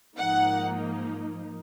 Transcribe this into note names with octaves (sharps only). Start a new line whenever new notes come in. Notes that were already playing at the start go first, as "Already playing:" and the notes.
G#2 F3 A#3 D#4 F#5